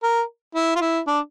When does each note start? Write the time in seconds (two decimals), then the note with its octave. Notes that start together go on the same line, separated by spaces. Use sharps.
0.03 A#4
0.55 E4
0.76 F4
0.81 E4
1.07 D4